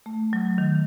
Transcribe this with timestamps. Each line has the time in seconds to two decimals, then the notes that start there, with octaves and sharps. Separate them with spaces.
0.06 A3
0.33 F#3
0.58 D#3